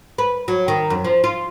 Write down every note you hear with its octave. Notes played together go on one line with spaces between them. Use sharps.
B4
F#3
D#3
F#2
F3
F4